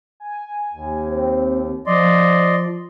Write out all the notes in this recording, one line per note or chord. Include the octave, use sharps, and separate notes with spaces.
G#5
D#2
C4
F3 D5 D#5 C6